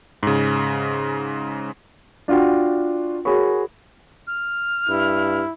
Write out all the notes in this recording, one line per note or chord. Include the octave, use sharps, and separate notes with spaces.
G#2 C#3
D4 F4 F#4 F#5 G5
F#4 G#4 A#4 C#5 B5 C#6
F6
G2 E4